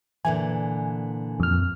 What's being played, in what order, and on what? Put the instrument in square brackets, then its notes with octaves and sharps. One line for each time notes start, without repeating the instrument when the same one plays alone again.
[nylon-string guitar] A#2 D3 E3 [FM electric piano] G#5
[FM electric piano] F2 F6